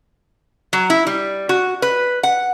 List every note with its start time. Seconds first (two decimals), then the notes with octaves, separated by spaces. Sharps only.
0.73 F#3
0.90 E4
1.07 G3
1.49 F#4
1.82 B4
2.23 F#5